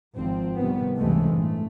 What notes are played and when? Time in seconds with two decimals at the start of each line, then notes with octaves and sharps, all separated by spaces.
0.17 G#1 F3 C4
0.58 C2 C3 D#3 G3 B3
0.97 C#2 G2 C3 E3 G#3 A3
1.35 A1 A3